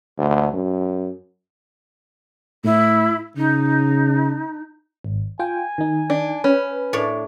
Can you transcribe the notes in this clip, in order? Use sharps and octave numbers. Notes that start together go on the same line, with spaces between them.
D2
F#2
A2 E4
C#3 D#4
G#1
F4 G5 G#5
D#3 D#4
D4
C#4 B4
A2 D4 C#5 D5